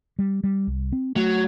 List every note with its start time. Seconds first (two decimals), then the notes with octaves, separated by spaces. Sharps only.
0.19 G3
0.44 G3
0.67 C2
0.92 C4
1.16 F#3 A3